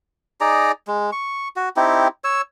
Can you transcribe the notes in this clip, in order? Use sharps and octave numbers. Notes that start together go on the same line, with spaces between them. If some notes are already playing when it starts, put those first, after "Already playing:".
D#4 G#4 D5 A#5
G#3
C#6
F#4
C4 D#4 E4 G4
C#5 E6